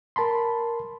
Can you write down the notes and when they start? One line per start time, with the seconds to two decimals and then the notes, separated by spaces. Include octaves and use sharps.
0.16 A#4 A5 B5 C6